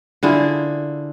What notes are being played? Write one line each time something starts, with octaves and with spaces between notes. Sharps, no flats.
D3 E4 F4 G#4